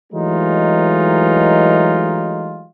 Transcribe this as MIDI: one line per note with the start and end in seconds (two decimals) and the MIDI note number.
0.13 2.66 52
0.13 2.66 54
0.13 2.66 56
0.13 2.66 57
0.13 2.66 63
0.13 2.66 65